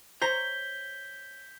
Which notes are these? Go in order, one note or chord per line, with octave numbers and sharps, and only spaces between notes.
C5 C#5 A#5 G6 B6 G7